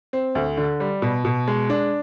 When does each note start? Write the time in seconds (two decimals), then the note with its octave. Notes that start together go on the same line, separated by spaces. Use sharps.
0.13 C4
0.35 D2
0.57 D3
0.80 G3
1.02 B2
1.25 B2
1.48 G#3
1.70 D4